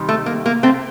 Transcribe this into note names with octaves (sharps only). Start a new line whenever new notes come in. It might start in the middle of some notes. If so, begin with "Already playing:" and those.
Already playing: C3 D#3 G3
A3
A#3
A#3
A3 C4